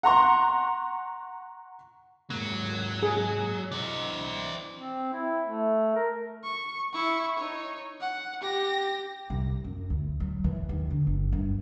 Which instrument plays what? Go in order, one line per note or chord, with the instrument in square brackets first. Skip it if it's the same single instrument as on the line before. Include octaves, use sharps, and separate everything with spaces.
[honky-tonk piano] F#5 A#5 C6 C#6
[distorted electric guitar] G#2 A#3 [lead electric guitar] F#3
[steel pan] G#4
[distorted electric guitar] E3 D#5 [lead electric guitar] C5 D5
[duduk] C4
E4
A3
A#4
[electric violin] C#6
E4 C#6
D#4 C#5
F#5
G4 A#6
[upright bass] C2
F#2
D2
F#3
E3
D#2
D3
G1
G2